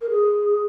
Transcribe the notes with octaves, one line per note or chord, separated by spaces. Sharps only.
A#4
G#4